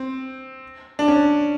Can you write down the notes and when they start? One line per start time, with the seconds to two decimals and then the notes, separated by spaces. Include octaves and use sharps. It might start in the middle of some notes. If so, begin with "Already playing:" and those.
Already playing: C4
0.99 D4
1.08 C#4